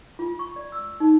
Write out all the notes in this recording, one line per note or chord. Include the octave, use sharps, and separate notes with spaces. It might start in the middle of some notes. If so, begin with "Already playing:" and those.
F4
C#6
D5
E6
D#4